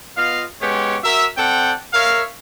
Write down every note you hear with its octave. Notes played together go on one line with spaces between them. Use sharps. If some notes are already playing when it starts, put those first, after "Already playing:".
B3 F4 D#5 F5
G#3 B3 C#4 G4 C#5
F#4 A#4 E5
C4 A4 D5 F#5 G5
A#4 C#5 E5 F5